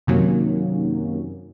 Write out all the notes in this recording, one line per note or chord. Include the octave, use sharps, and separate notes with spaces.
F#2 C3 D#3 F#3 A#3 C#4